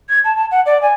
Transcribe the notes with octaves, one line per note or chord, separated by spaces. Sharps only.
G#6
A5
A5
F#5
D5
G#5